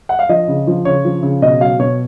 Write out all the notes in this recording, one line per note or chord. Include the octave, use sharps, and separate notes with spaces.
F#5
F5
F3 D#5
C#3
F3
C#3 C#5
F3
C#3
B2 D#5
F#3 F5
B2 C#5